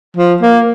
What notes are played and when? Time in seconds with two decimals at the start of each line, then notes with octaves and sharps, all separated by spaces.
0.17 F3
0.42 A#3